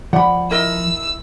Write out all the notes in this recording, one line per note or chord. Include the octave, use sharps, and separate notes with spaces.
F3 D5 F#5 B5
E4 A#4 D#5 E6